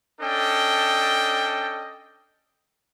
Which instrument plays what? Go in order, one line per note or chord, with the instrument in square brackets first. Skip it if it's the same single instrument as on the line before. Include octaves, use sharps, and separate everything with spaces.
[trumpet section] C#4 D4 A4 D#5 G5